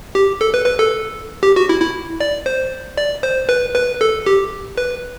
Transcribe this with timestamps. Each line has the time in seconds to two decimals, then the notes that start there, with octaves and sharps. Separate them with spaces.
0.15 G4
0.41 A4
0.54 B4
0.66 B4
0.79 A4
1.43 G4
1.56 F#4
1.69 E4
1.81 E4
2.20 D5
2.46 C5
2.97 D5
3.23 C5
3.49 B4
3.75 B4
4.01 A4
4.26 G4
4.78 B4